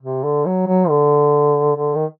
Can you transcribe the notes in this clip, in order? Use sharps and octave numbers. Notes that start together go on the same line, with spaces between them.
C3
D3
F#3
F#3
D3
D3
D#3